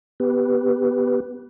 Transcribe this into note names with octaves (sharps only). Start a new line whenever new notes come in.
B3 G4 B4